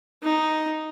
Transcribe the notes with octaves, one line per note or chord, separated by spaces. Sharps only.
D#4